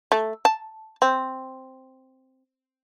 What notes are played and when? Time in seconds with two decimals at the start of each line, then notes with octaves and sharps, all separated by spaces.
0.12 A3
0.45 A5
1.02 C4